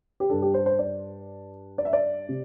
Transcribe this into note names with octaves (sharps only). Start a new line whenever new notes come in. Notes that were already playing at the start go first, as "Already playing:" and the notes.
G4
G2 G3 D4 A4
G4
C5
C5
D5
D5
E5
D5
C3